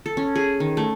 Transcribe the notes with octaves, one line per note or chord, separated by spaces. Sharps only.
A4
C#4
G#4
D#3
A3